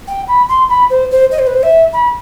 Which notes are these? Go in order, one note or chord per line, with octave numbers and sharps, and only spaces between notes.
G5
B5
C6
B5
C5
C5
D#5
C5
B4
C5
E5
B5